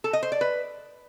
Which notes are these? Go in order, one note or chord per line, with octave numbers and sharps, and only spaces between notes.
A4
D#5
C5
D5
B4